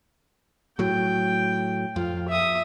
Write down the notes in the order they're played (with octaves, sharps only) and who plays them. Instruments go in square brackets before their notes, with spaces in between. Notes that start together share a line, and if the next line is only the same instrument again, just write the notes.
[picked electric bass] A2 F#3 [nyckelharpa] G5
[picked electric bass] F2 [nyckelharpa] F4
[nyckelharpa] E5 D#6